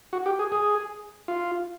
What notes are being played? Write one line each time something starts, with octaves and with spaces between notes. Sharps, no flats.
F#4
G4
G#4
G#4
F4